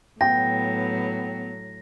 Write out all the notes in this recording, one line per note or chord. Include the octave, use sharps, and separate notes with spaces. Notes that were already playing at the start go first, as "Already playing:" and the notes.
A2 F#3 B3 G5 A#6